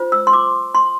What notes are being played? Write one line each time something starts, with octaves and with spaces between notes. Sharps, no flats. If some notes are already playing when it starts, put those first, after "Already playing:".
Already playing: F4 C5
E6
C6
D6
C6